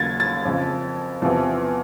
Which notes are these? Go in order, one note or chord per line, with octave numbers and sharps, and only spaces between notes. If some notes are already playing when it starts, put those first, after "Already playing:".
Already playing: D#2 C#3 F#3 G#6 A6
A6
F2 C#3 F3
E2 C3 F3